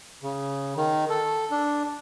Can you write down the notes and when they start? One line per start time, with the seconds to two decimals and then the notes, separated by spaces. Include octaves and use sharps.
0.23 C#3
0.77 D#3
1.09 A4
1.51 D4